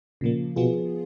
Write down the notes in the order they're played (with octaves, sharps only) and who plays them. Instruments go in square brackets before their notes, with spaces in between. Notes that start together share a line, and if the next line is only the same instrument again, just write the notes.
[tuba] A#2 [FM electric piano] C#3 F3 A#3
[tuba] B2 [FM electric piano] F3 B3 F4 G#4